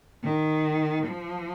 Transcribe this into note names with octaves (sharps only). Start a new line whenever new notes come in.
D#3
F3